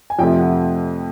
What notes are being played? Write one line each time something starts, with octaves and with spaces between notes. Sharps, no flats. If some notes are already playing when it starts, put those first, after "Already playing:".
G#5
F2 C3 F3 A3 G5
F#5